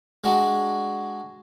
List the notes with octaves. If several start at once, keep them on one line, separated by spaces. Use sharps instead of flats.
G#3 D4 F#4